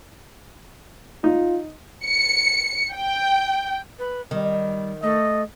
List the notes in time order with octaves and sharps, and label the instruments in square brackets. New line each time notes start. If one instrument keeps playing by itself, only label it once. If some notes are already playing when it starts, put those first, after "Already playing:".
[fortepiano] D#4 [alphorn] F4
[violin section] C#7
G5
[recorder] B4
[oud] D#3 [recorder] G3
[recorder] A3 [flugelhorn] D#5